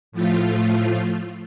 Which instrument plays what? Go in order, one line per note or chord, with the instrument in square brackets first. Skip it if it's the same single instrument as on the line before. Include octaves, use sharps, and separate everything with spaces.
[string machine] A2 F3 A3 F4